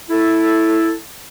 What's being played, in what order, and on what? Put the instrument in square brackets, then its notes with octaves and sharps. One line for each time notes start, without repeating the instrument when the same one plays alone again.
[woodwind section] E4 A4